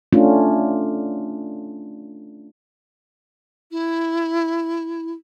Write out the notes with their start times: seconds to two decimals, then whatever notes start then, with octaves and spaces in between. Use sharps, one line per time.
0.13 A3 C#4 D4 F4
3.71 E4